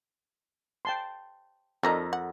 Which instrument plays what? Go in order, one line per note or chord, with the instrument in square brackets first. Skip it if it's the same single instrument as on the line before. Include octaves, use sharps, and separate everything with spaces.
[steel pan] G5 A5 C6
[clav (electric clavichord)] F2 A#5 [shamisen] D3 D4 D#4 [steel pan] A4 A#4 D#5
[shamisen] F#5